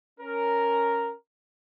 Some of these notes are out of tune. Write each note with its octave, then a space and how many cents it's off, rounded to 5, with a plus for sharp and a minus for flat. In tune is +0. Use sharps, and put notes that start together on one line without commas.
C#4 +0 A#4 +0